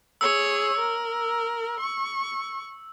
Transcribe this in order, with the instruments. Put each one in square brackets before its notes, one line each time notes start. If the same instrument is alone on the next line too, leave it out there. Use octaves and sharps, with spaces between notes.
[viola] G#4 C#5 [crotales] E6
[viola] A#4
C#6